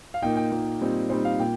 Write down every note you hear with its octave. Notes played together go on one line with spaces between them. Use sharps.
F5
A#2 A#3 D#4 G5
G5
A#2 A#3 D#4
A#2 G3 C4 D#4
A#2 G3 C4 D#4 C5
F5
A#2 G5